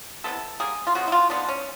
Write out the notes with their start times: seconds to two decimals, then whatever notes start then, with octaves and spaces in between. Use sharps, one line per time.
0.24 C3 E3 G#3 B3 A4
0.60 D3 G3 A#3 G#4
0.87 F4
0.95 C#3 F3 G#3 B3 F#4
1.08 E4
1.12 F4
1.30 D#3 G#3 B3 D4
1.49 C#4